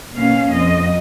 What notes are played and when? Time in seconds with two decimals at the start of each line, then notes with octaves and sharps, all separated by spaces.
0.13 B2 A#3 C#4 F5
0.49 F2 D#5